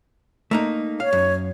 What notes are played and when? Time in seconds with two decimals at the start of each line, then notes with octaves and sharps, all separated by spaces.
0.51 A3 A#3 D#4
1.00 C#5 F5
1.13 F#2